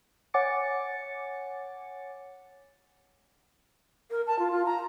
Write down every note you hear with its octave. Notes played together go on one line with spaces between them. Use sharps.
C#5 F#5 G#5 D6 A6 C#7
A#4
A5
F4
F4
A#5